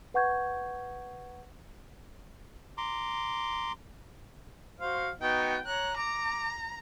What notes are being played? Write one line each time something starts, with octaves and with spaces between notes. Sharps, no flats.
B4 F#5 C#6 G6 G#6
A#5 C6 D6
F#4 C5 F5
B3 D#4 F#4 G5
C#5 A#5 F#6
A#5 D6